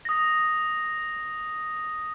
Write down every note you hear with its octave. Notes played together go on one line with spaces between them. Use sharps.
D#6 A#6